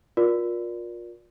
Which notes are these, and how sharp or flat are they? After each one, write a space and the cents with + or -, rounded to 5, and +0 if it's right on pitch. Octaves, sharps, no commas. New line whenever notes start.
F4 +30 A#4 +30 D5 +0